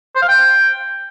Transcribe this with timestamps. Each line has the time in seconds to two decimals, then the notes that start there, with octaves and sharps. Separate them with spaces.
0.16 C5
0.22 F5
0.28 G5